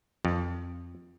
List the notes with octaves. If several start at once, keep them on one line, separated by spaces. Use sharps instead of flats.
F2